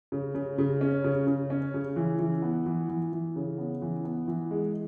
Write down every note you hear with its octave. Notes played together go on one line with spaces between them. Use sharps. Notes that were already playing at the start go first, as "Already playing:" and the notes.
C#3
C#3
C#3
C#4
C#3
C#3
C#4
C#3
E3
E3
B3
E3
E3
E3
C#3
B3
E3
B3
E3
G#3